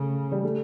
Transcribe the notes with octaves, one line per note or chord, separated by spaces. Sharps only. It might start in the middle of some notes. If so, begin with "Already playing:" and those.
Already playing: C#3 A3
G3
A3